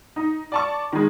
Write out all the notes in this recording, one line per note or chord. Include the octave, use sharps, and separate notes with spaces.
D#4
D5 A5 C#6
D#3 G#3